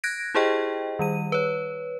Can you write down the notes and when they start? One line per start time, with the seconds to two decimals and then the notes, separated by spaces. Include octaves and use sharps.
0.04 F#6 G#6 A#6 D7
0.35 E4 G4 G#4 C5 D#5 G5
0.99 D#3 G3 D#7
1.32 B4 C#5